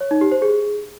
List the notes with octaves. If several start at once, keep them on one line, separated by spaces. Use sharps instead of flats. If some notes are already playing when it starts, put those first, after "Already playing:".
C#5
D#4
G4
C5
G#4